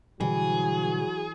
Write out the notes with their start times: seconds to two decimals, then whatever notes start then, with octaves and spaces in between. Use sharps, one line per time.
0.20 B2 D3 E3 F#3 G3 G#4